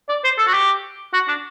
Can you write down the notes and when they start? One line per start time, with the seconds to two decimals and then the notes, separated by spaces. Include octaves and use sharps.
0.09 D5
0.24 C5
0.38 A4
0.47 F#4
0.54 G4
1.13 F#4
1.28 D4